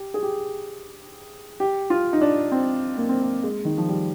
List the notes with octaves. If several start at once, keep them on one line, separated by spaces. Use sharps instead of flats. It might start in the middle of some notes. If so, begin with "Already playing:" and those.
Already playing: G4
G#4
G4
G4
F4
D#4
D4
C4
A#3
C4
A#3
G#3
D#3
F3
G3